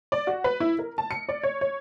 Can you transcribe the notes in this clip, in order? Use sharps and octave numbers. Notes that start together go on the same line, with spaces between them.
D5
F#4
B4
E4
A#4
A5
C#7
D5
C#5
C#5